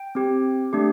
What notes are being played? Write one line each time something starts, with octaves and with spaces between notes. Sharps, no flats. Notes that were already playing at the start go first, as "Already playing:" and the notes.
Already playing: G5
C4 G4
A3 D4 G4